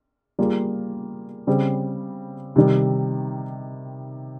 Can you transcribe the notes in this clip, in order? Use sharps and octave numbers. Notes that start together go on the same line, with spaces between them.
G3 A#3 F4 G#4
C#3 G3 C4
C3 D#3 G3